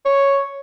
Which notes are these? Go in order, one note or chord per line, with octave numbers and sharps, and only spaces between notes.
C#5